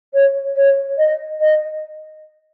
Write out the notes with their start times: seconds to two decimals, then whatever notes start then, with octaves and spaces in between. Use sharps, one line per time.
0.12 C#5
0.55 C#5
0.98 D#5
1.40 D#5